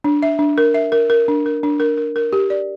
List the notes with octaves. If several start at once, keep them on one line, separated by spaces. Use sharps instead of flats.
D4
E5
D4
A#4
E5
A#4
A#4
D4
A#4
D4
A#4
A#4
A#4
G4
D5